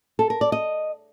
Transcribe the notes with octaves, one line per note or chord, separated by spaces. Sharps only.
A4
A#4
D5
D#5